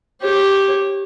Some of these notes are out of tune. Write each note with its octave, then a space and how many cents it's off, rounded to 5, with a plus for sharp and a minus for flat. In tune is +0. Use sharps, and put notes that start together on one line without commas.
G4 +0 C#5 -25